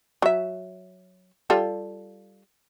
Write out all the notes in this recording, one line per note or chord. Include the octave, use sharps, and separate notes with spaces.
F#3 E5
G3 F4 A4